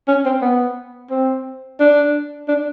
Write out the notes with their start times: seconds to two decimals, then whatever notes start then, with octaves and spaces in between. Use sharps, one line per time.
0.08 C#4
0.25 C4
0.42 B3
1.10 C4
1.80 D4
2.48 D4